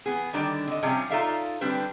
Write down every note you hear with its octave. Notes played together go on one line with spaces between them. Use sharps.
E3 B3 G#4
D3 D#3 G3 D4
D3 D#5
C3 F3 G3 C#4 G#4
D#4 F4 A4 D5 E5 F5
D3 G3 C4 D4 B4